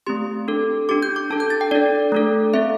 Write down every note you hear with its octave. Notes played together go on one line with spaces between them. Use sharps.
A3 C4 G4 C6
D4 A4
D4 G4 D6
G6
D6
D4 A4 A5
G6
A6
G5
D4 A4 D5
A3 D4 A4
C4 A4 E5